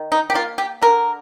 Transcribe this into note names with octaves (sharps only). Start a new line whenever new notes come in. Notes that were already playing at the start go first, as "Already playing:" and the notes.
Already playing: D#3
D#4
G4
A#3 F4
G4
D3 A#4